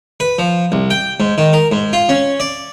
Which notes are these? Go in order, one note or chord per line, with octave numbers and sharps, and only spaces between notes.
B4
F3
C2
G5
G#2
D#3
A#4
G#2
F4
C#4
D5